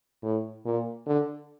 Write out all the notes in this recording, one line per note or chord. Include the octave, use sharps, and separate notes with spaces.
A2
A#2
D3